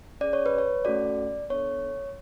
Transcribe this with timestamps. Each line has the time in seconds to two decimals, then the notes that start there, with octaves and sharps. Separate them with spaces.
0.21 C#4 G#4 D5
0.33 C#5
0.46 B4
0.58 C#5
0.85 A3 C#4 F#4 A4 D5
1.50 B3 D4 A4 C#5